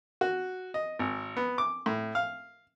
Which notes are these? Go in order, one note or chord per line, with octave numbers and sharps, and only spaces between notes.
F#4
D#5
G#1
B3
D6
A2
F5